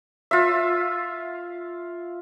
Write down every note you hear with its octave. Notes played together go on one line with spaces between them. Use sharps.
F4 E5